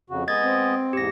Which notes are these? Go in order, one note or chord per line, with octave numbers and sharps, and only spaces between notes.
F2 C#3 F#4
G#3 B3 D#5 G#6 A6
C4
E2 G#2 G4 A#6